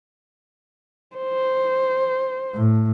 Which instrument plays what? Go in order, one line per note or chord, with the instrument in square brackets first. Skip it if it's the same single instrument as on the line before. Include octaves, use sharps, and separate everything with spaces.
[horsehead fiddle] C5
[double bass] A2